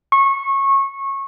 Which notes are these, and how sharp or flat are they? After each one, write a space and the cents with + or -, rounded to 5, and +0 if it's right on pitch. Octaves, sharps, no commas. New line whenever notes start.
C#6 -25